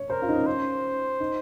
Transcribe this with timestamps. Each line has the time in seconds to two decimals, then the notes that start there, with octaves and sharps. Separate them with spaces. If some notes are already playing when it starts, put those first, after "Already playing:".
Already playing: C#5
0.10 A#4 C5
0.22 F4
0.29 D#4
0.35 C#4
0.46 C#4 C5
1.20 D#4